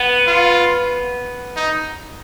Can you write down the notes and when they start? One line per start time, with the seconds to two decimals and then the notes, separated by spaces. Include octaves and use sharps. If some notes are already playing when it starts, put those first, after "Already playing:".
Already playing: B3
0.27 F4
1.56 D#4